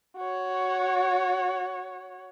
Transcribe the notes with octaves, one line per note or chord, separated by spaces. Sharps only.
F#4 C#5